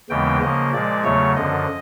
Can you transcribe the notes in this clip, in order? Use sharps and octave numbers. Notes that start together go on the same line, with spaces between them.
D#2 C#3 E3 G#3 B3 G5
C#3 F3 A#3 D#5
A#2 F3 G#3 D5
E2 C#3 F#3 A3 C#5
F#2 D3 F3 D#5